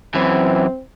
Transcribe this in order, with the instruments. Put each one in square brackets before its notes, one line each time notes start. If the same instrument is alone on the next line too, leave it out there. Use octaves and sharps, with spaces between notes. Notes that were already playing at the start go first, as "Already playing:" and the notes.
[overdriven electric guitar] F#2 E3 [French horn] C4